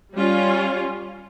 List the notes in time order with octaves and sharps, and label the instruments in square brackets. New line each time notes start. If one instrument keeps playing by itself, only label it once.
[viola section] G3 C#4 F4